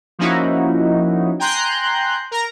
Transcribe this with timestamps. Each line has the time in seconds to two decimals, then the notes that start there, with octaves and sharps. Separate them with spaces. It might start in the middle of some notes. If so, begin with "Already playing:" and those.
0.19 F3 A#3 C#4 D#4 E4 F#4
1.39 G5 G#5 A#5 C6 F#6 G6
2.31 A#4 A#5